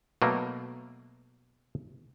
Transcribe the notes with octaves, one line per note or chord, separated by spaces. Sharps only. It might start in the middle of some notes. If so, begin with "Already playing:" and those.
B2 F#3 A3 A#3